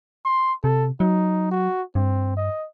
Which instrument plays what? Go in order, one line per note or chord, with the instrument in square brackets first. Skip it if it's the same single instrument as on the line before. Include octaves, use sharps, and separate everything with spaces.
[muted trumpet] C6
[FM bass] C3 [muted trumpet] A4
[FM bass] F#3 [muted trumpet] D#4
[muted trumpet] F#4
[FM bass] G2 [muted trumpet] C4
[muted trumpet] D#5